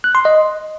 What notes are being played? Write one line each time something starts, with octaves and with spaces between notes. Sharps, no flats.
F#6
C6
D#5